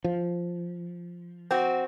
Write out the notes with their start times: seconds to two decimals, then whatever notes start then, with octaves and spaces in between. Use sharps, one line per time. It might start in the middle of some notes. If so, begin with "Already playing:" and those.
0.04 F3
1.51 C4 F#4